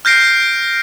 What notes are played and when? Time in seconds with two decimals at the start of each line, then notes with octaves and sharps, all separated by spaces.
0.05 F6 G6 A#6 C7 D7